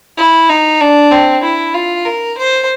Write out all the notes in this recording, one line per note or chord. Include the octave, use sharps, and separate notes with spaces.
E4
D#4
D4
C4
E4
F4
A#4
C5